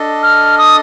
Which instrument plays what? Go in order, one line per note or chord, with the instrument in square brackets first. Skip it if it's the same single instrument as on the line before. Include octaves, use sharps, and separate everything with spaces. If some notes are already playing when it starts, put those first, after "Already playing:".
Already playing: [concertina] D4 A4 D#5
[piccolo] F6
D#6